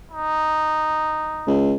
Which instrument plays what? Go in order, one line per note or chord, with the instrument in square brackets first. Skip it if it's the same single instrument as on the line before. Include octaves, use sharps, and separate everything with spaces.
[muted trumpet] D#4
[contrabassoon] C#2